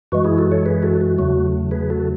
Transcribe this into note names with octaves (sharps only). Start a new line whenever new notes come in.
F#2 E3 G#3 F#4
E4 G#4
F#4 A4
A4 C#5
G#4 B4
F#4 A4
F#4
E2 C#3 F#3 A3 F#4
G#4 B4
F#4 A4